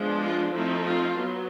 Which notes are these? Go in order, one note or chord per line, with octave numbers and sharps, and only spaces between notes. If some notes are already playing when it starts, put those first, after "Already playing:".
Already playing: F3 G#3 B3 D4
F4
F3 A3 C4 D#4 E4
F4
F#3 B3